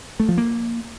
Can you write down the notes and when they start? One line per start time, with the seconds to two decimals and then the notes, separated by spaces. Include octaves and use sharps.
0.20 A3
0.29 F3
0.38 A#3